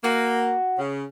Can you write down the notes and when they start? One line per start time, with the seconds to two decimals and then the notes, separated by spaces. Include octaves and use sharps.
0.04 A#3 F#4
0.78 C#3